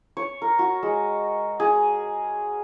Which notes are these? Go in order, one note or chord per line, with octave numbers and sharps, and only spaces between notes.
C#5
A#4
F#4
G#3
G#4